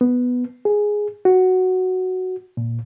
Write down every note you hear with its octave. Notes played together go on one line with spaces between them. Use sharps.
B3
G#4
F#4
A#2